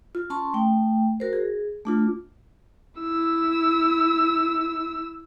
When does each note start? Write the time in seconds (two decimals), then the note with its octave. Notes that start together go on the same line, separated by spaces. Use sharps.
0.15 F4
0.30 C#4 A5 C6 C#6
0.54 A3 G5
1.20 F#4 A#4 C5
1.33 G#4
1.85 A3 D4 F4
3.00 E4 E6